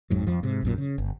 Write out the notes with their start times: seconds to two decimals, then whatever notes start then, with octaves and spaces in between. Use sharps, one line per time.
0.10 A1 F2 G#2 F#3
0.27 F2 F3
0.43 G#2 C3
0.63 A#1 F#2 A#2
0.78 C#3
0.98 G1